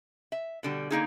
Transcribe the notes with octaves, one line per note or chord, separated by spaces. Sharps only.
E5
B2 D3 G3
D3 A#3 D#4 G#4